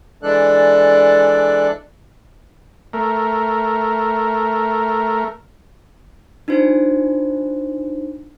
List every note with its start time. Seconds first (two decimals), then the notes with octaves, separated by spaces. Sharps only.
0.23 E3 G#3 D4 A4 D5 F#6
2.93 A3 A#4
6.48 D4 D#4 F4 C5